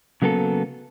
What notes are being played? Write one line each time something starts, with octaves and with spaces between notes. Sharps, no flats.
C#3 F#3 A#3 B3 G4 A4